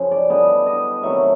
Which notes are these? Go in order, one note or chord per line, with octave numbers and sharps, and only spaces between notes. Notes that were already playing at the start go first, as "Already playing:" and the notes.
Already playing: F#2 C#3 F3
D5
D3 G3 B3 D#5
D#5
C3 D#3 F#3 A3 E5